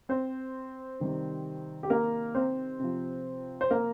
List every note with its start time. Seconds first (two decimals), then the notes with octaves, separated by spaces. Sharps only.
0.09 C4 C5
1.00 C3 D#3 G3
1.83 G4
1.90 A#3 A#4
2.35 C4 C5
2.80 C3 F3
3.61 C5
3.71 A#3 A#4